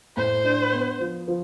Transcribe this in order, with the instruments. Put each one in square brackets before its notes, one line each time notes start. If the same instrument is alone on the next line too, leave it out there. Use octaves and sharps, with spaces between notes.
[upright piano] A2 [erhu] C5
[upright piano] D4
B3
F3
F3